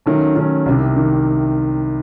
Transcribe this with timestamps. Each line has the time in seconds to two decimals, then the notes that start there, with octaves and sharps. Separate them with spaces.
0.06 D#3 F#3 A3 C#4
0.36 D#3 F#3 A3 C#4
0.66 C2 C3 D#3
0.96 D#3